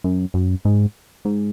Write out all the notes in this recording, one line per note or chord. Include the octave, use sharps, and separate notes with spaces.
F#2
F#2
G#2
G#2